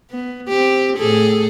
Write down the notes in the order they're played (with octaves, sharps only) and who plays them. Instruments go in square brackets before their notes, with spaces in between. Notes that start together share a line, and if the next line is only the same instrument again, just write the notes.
[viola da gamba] B3
C4 G4
A2 G#4 A4